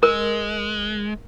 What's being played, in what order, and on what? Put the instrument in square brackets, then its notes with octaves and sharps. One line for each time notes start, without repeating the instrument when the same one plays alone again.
[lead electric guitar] G#3 [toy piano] A#4